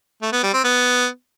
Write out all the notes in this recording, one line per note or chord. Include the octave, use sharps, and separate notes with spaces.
A3
B3
G3
C4
B3